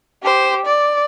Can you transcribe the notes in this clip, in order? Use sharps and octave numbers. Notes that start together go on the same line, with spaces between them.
G4 C5
D5